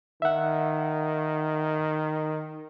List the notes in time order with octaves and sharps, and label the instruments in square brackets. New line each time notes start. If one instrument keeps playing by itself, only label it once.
[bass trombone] D#3 [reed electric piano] E5 F#5